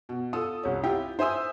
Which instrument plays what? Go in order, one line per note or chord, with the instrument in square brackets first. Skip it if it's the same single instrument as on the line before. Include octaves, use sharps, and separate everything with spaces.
[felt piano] B2
F4 A4 D#6
C2 C#4
E4 F4 G4 G5
C5 E5 G#5 D#6 E6